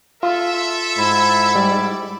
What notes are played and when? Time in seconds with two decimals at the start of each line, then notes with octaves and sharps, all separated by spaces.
0.23 F4 A4 E5 C6
0.98 G#2 E4
1.56 G3 D5